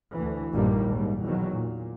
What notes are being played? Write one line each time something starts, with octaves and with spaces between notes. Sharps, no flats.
D2 E3
A#1 G2 A#2 D#3 G3 A#3
D#2 G#2 G3
E2 B2 D#3 F#3
A#2